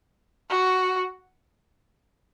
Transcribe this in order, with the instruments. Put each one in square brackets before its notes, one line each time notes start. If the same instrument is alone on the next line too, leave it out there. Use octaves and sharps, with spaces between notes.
[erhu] F#4